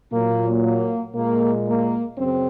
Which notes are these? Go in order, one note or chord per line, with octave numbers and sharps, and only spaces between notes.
A#2 F#3 A#3
A#3
A#2 G#3 A#3
A#3
F#2 C#3 C4